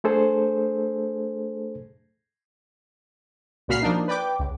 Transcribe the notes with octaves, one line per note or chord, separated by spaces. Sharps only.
A3 D4 G#4 A4 C5
C#2 A#2 F#4 B5 F6 C7
F3 A#3 D4 D#4
B4 D5 G5 D6
C#2